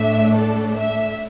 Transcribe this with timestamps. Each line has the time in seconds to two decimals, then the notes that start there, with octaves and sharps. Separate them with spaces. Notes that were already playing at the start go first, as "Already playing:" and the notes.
Already playing: A2 A3 D4 E5
0.35 A4
0.76 E5